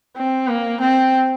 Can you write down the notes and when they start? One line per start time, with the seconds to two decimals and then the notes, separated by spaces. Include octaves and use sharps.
0.17 C4
0.48 A#3
0.81 C4